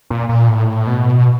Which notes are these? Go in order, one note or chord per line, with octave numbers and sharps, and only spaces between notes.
A#2
A#2
A2
B2